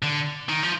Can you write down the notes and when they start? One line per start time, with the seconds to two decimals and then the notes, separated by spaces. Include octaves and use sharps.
0.03 D3
0.49 D#3
0.63 F3